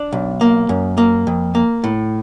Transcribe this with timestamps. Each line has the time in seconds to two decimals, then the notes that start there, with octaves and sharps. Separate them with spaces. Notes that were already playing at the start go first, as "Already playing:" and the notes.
Already playing: D4
0.13 B1
0.41 A#3
0.69 F#2
0.98 A#3
1.27 F2
1.55 A#3
1.84 A2